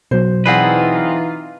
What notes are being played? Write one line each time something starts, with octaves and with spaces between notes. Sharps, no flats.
B2 F#3 C5
E3 C4 D#4 F4 G#4 B4 D5 F#5